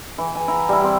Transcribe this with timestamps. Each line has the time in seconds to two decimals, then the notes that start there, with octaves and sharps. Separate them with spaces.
0.18 E3
0.35 G#5
0.48 E4 F#5 A#5
0.69 G3 E4
0.82 G3 C4